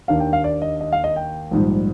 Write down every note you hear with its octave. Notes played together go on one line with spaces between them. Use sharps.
D#2 D#3 A#3 D4 F5
G5
F5
D5
D#5
D#5
F5
D#5
G5
A#1 G#2 D#3 G3